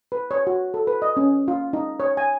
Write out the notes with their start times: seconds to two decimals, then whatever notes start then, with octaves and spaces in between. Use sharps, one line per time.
0.12 B4
0.31 C#5
0.47 F#4
0.74 A4
0.87 B4
1.02 D#5
1.17 C#4
1.48 F4
1.73 D#4
2.00 C#5
2.17 G#5